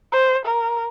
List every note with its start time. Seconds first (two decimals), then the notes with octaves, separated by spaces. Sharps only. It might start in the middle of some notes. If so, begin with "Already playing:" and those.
0.12 C5
0.45 A#4